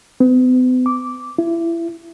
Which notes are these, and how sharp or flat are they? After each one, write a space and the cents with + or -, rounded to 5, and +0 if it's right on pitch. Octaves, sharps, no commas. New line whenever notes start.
B3 +45
D6 -5
E4 +25